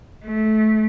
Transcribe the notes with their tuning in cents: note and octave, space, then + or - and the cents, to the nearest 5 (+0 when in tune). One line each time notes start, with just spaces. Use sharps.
A3 -20